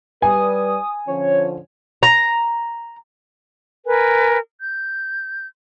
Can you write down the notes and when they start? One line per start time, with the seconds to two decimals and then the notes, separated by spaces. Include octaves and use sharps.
0.22 G3 B4 G#5 D#6
1.08 D3 F3 C#4 C#5
2.03 A#5
3.86 A#4 B4 G#5
4.60 G6